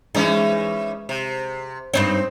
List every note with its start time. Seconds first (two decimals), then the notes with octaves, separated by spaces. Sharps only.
0.15 E3 G#3 C#4 D#4
1.09 C3
1.94 G2 C4 D#4 C#5